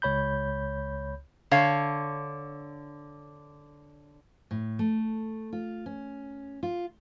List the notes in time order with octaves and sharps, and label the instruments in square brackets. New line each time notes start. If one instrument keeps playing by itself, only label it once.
[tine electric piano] C#2 C#5 B5 G6
[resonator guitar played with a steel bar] D3 C#5 F5
[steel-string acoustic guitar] A2
A3
F4
C#4
F4